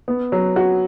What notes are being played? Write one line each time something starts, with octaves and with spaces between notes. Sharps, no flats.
B3
F#3
F#4